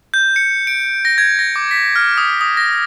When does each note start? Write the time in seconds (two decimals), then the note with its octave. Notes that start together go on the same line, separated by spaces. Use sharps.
0.14 G6
0.36 C#7
0.67 D7
1.05 A#6
1.18 G#6
1.39 A#6
1.56 D6
1.71 B6
1.96 F6
2.18 D#6
2.41 D#6
2.57 A#6